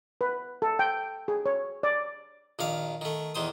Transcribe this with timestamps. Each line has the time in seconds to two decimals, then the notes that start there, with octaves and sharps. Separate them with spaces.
0.21 B4
0.62 A4
0.79 G5
1.28 G#4
1.46 C#5
1.83 D5
2.59 A#1 D#3 F5
3.01 D#3 A3
3.35 E2 D#3 C5 D#6